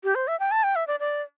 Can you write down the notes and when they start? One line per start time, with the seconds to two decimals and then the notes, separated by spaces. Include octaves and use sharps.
0.04 G4
0.15 C5
0.28 E5
0.40 G5
0.51 A5
0.63 G5
0.76 E5
0.87 D5
1.00 D5